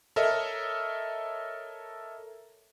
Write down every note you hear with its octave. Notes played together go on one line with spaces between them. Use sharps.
A4 A#4 C#5 D#5 E5